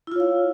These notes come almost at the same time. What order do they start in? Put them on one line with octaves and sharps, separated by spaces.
E4 F4 C#5 F5